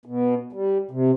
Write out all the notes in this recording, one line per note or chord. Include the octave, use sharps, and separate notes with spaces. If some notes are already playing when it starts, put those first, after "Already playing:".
B2
G3
C3